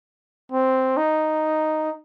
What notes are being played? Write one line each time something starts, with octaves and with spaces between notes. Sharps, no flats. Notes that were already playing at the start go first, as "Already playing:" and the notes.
C4
D#4